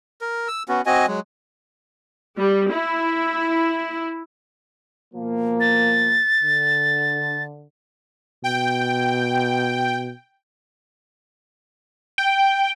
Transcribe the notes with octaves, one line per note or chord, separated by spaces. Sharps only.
A#4
E6
B3 C#4 F#4
C4 F#4 D#5 G#5
F#3 G#3
G3
E4
B2 F3 A#3
A6
D3
B2 G5
G5